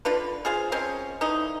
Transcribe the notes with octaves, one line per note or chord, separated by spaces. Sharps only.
D3 D4 F4 B4
F4 G#4 C5 F5
F3 G#3 C4 C#4
D3 E3 D#4